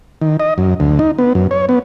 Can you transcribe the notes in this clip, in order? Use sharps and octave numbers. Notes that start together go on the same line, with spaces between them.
D#3
D#5
F#2
D2
D#4
B3
F#2
C#5
B3